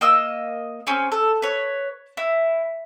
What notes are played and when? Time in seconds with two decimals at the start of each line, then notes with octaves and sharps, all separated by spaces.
0.01 A#3 D#5 E6
0.87 C4 C#4 G#4
1.12 A4
1.42 B4 C#5
2.17 E4